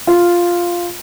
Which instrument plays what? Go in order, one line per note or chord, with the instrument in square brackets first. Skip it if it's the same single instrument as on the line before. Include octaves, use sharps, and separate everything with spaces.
[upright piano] F4